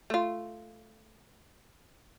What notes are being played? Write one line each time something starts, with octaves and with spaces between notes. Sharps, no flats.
A3 F4